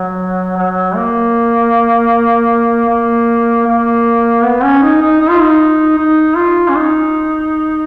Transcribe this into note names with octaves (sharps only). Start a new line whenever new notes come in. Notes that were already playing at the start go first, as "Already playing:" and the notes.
Already playing: F#3
F#3
A#3
A#3
A#3
B3
C#4
D#4
D#4
D#4
F4
D#4
D#4
F4
C#4
D#4